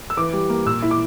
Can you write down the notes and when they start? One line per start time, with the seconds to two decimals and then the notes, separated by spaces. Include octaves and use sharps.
0.10 E6
0.17 E3 D6
0.33 G3
0.49 A#3
0.66 A#2 E6
0.82 E4
0.91 D6